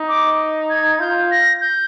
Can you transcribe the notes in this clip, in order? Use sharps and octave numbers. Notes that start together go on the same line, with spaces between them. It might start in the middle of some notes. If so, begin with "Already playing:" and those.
Already playing: D#4
D6
G#6
F4 G6
A#6
G6